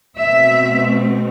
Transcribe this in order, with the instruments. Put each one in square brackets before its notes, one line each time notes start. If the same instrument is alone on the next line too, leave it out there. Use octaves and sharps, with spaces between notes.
[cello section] B2 A3 C4 E5